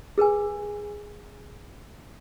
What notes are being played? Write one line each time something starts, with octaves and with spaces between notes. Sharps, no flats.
G#4 A#4 B4 G#5